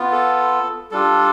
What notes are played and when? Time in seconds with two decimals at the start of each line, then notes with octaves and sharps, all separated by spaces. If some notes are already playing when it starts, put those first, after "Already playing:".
Already playing: B3 F4
0.12 A4
0.91 G3 D4 F4 A4